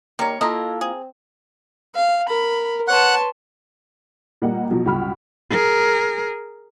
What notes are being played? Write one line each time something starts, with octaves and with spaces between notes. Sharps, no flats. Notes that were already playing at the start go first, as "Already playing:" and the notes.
D#3 G3 A#3 C#5
A#3 E4 F4 A4 D#5
C4 G#4
F5
A#4 B5
B4 C#5 F#5 A5 C6 F#6
A#2 G3 A#3 D#5 F#5
B2 F3 F#3
G1 C#2 F#4 B5 F6
G#4 A#4